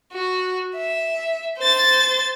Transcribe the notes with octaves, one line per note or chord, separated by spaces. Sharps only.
F#4
E5
C5 A6